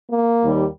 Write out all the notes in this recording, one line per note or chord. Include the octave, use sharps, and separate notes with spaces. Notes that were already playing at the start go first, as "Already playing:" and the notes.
A#3
D#2 D#3 G3